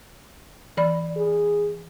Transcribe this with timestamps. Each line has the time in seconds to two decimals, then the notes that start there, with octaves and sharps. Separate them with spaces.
0.77 E3 D5 B5
1.16 G#4